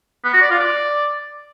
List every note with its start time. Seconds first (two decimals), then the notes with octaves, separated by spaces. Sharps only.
0.24 B3
0.33 F#4
0.41 D5
0.50 F4
0.59 D5